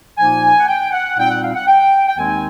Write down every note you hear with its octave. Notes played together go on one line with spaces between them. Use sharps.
A#2 F3 A#3 D#4 G#5
F#5
G5
F#5
A#2 G3 C4 D#4 G5
F#5
F5
F#5
G5
G5
D#2 D#3 G#3 C4 D#4 G#5